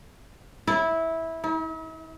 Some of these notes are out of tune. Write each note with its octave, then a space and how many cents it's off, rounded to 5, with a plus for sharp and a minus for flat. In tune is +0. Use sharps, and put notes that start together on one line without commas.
E4 -15
E4 -45